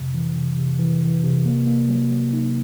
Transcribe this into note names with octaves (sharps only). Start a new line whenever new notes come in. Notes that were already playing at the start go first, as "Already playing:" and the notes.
Already playing: F2 C3
E3
C3
C3
E3
E3
C3
A#3
A#3
F#3
F#3
D#4